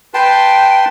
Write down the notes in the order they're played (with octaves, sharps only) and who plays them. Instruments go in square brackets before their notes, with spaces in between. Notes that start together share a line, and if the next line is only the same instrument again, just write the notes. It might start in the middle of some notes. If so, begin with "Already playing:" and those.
[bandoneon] B4 A5 C6 [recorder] G5